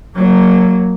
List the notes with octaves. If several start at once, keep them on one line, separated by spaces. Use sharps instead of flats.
F#3 A#3